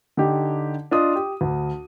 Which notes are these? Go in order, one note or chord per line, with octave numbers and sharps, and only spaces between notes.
D3 D#4 G4
D4 F4 D#5 D#6
G4
D2